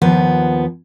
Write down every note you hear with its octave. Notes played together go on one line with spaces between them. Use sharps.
D#2 F3 B3